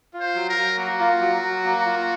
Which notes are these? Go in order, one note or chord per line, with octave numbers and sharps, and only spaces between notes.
F4
C5
F#3
A#4
F#3
A#3 F#4
F4
F#3
F#3
A#3
F4